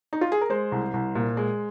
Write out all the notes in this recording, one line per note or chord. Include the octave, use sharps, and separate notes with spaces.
D#4
F4
G#4
A#4
G#3 C5
C2
C2
A#2
G#3